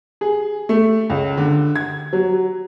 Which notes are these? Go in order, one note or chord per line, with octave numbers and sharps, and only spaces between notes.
G#4
A3
C#2
D3
G#6
F#3